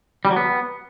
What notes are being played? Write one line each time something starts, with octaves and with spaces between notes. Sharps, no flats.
G3
F#3
B3